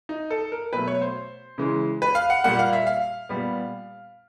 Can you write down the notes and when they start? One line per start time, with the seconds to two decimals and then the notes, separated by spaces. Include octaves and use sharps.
0.09 D#4
0.30 A4
0.52 A#4
0.73 B2 F#3 A3 B4
0.88 C#5
1.01 C5
1.58 C#3 E3 G#3
2.02 B4
2.15 F5
2.30 F#5
2.44 A#2 G3 A#3 F#5
2.59 F5
2.73 E5
2.87 F5
3.29 A#2 G3 B3